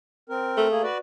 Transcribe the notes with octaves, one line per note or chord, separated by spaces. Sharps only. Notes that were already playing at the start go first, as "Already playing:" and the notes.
C4 A#4
A3
A#3 G#4
F#4 B4 D5